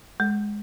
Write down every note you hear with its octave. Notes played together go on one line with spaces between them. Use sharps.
G#3